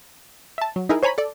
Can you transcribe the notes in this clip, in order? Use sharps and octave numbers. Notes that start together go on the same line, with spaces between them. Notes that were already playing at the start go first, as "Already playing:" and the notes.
E5 A5
F#3
D#4 E4 G#4 A#4
C5 C#5 G#5 A#5 B5
A4 D5